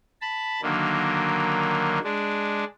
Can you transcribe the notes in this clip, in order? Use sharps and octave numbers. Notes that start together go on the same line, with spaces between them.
A5 B5
D3 D#3 F#3 A#3
G#3 D4